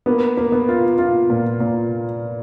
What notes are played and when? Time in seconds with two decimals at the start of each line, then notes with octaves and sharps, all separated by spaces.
0.06 A#3 B3
0.37 A#3
0.52 B3
0.69 F4
0.98 B3 F4
1.30 A#2
1.60 A#2